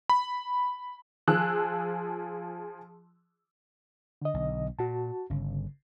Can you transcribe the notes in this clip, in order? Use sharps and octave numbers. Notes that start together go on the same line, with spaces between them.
B5
F3 G#4 E6 F#6
D3 D#5
B1
A#2 F#4 A5
G1 C#3